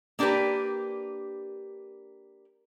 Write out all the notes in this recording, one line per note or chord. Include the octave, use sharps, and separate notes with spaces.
A#3 D4 G4 A#4 B4